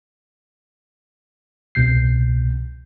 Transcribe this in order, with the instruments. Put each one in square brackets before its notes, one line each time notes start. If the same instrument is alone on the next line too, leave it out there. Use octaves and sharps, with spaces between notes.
[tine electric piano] C2 B2 G6 C7